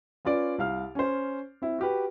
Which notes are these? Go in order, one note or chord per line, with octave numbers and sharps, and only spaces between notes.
C#4 F4 B4 D5 D7
C2 F5 F6
C#4 C5
C4 E4
F#4 G4 B4